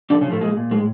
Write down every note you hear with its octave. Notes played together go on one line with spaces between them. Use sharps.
D3 F3 D4
C#3 C#4
A2 F3 A3
A#2 G#3
A#2
A2 G#3